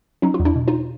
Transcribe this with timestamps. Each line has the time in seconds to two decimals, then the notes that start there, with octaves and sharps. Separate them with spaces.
0.22 F#3 C#4 D#4
0.34 F4
0.40 E2
0.45 D4 E4
0.56 B2
0.68 D#4 F4